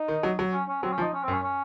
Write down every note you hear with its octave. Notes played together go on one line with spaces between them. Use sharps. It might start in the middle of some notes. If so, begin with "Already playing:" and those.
Already playing: D#4
D#3
F#3
F#3
C#4
C#4
F#3 C4
C#4
F3
D#4
C#4
C4
F#2
C#4
C#4